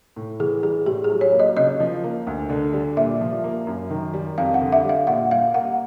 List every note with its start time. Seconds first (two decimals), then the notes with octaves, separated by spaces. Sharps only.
0.16 A2
0.40 E3 G#4
0.63 G3 G#4
0.86 A2 G4
1.04 G#4
1.10 F#3
1.21 C#5
1.33 A#3
1.40 D#5
1.57 C#3 D#5
1.80 F3
2.04 A#3
2.27 D2
2.50 D3
2.73 G3
2.97 A#2 E5
3.21 F3
3.44 A#3
3.67 F#2
3.90 D#3
4.14 G3
4.38 F2 F5
4.54 F#5
4.61 D3
4.72 E5
4.84 G3 F5
5.07 A#2 F#5
5.31 G3 F5
5.54 A#3 F#5